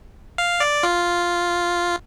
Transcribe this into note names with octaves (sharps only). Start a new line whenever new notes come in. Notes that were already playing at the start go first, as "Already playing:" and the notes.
F5
D5
F4